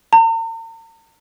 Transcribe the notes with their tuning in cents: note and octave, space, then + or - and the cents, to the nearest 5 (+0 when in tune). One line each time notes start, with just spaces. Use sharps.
A#5 -45